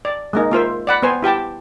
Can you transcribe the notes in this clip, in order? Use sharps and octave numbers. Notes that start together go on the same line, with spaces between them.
D5
G#3 A#3 D#4
A#3 F4 C5 E5
D5 F#5 B5
B3 C5 G#5
E4 G4 G5 A5